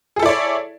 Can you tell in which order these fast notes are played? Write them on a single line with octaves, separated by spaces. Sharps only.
G#4 A4 E4 D5 C#5